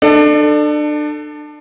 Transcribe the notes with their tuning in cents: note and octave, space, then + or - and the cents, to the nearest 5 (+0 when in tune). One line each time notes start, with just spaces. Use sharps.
D4 +30 A4 +10